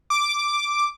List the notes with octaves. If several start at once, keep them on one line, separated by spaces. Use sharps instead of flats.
D6